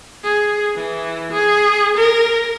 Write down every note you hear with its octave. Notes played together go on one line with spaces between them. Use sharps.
G#4
E3
G#4
A#4